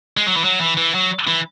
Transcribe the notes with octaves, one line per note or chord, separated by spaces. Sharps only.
G#3
F#3
E3
F#3
E3
E3
F#3
E3